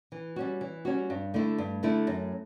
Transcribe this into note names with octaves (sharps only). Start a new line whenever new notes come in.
E3
G3 C#4 F#4
E3
G3 C#4 F#4
G2
D3 A3 E4
G2
D3 A3 E4
F#2